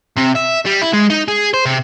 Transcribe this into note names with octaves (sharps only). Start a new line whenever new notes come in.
C3
E5
G3
E4
G#3
D#4
G#4
C5
C3